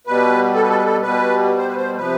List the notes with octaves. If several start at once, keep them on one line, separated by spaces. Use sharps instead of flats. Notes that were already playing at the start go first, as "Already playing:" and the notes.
B2 G3 B4
A4
B4
A4
B4
A4
B2 G3 B4
C5
B4
C5
C3 F3 B4